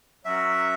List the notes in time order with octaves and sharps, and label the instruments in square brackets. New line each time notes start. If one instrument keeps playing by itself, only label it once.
[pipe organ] F#3 C#4 F#4 A#4 [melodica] E5